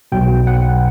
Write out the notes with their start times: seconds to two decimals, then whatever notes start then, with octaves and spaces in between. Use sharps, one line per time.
0.12 B1 B2 F#3 G5
0.47 F#5